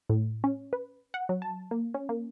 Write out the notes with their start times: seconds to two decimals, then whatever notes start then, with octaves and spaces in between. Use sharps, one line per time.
0.09 A2
0.44 C#4
0.73 B4
1.14 F#5
1.29 F#3
1.42 A5
1.71 A#3
1.94 C#4
2.09 A#3